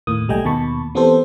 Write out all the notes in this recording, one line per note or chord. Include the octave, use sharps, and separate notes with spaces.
D#2 A2 A#3 D#6
B1 G3 A3 D#5 G5 G#5
D#2 B2 A#3 A5 B5 C#6
E3 B3 C4 G4 A4 C5